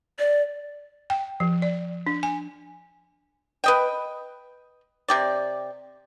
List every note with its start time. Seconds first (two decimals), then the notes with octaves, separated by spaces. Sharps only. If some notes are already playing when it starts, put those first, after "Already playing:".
0.19 D5
1.10 G5
1.40 F3
1.62 D5
2.07 D4
2.23 G#5
3.64 B4 D#5 G5
5.08 C3 G4 D5